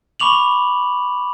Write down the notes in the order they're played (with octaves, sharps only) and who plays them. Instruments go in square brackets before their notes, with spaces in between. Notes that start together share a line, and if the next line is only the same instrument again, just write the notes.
[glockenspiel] B5 C#6 D6 F7 F#7